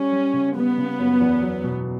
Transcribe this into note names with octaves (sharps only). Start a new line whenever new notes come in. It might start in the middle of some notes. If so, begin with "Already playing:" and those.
Already playing: G3 C#4
G3
C#3
G3 B3
C#3
F#2
E2
F#3
B2